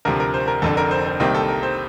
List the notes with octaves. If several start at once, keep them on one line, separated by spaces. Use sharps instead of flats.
D2 C3 F3 A#4
A#4
C5
A#4
F1 F2 D3 A4
A#4
C5
C5
C2 C3 D#3 A#3 C5
A4
A#4
C5